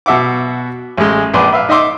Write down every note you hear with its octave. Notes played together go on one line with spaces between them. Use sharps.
B2 F#4 E5 F#5 D6
A1 G#3
A#1 B4 D5 G#5 C6
B4 E5 F5
D#4 D#5 E5 C6 D6